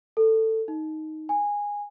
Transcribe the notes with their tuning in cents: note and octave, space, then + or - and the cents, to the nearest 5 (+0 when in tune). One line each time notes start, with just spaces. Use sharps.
A4 +15
D#4 +5
G#5 -15